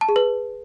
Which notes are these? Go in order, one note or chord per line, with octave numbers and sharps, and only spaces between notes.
A5
G#4
B4